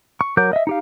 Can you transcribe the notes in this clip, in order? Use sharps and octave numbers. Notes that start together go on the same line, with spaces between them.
C#6
F#3 A#4 D6 G6
D#5 E5
D#4 G4 F5